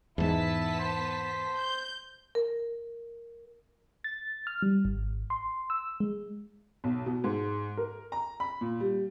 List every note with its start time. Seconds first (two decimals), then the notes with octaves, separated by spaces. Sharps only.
0.18 E2 G#2 B3 E4 A5 B6
0.80 C5
1.55 G6
2.35 A#4
4.04 A6
4.47 F6
4.62 G3
4.85 G#1
5.30 C6
5.70 E6
6.00 G#3
6.84 B1
7.06 B2
7.24 G#2
7.77 A#4
8.12 A#5
8.40 B5
8.61 A#2
8.80 G3